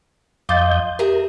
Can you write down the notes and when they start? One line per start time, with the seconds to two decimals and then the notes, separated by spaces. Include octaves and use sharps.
0.49 F2 F4 D#5 D6 G6 A6
0.99 G4 G#4 A#4 E5 D#6